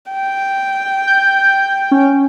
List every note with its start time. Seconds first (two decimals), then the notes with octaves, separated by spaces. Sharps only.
0.11 G5
1.07 G6
1.91 C#4